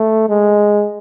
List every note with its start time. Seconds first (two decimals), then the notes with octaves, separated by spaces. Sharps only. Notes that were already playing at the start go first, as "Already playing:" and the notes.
Already playing: A3
0.29 G#3